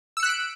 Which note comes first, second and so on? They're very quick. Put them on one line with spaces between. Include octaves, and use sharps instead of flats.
E6 C#7 F#6 B6 D7